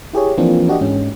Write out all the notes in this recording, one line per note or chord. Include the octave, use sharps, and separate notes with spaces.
E4 G4 G#4 C#5
E3 F3 A#3 C4 D4 F4
D4 F#4 G4 D#5
G#2 G#3 C#4